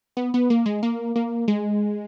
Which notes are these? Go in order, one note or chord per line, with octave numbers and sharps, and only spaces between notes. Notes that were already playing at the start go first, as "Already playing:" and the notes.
B3
B3
A#3
G#3
A#3
A#3
G#3